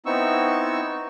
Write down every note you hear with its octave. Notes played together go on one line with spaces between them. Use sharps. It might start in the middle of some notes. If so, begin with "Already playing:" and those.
B3 C4 D#4 E4 C#6 E6